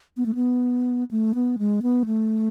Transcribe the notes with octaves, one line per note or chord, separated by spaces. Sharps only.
B3
A3
B3
A3
B3
G#3
B3
A3